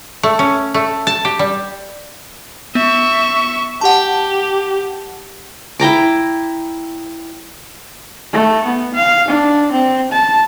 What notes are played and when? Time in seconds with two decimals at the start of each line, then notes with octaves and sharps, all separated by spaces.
0.23 A3
0.39 C#4
0.74 A3
1.07 A5
1.25 G4
1.39 G3
2.75 B3 E5 C#6
3.81 G4 F#5 A5
5.80 E4 G5 A#5 D6
8.33 A3
8.65 B3
8.94 F5
9.28 D4
9.72 C4
10.12 A5